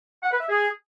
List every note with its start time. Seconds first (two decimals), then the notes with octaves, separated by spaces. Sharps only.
0.23 F#5
0.32 B4
0.40 E5
0.49 G#4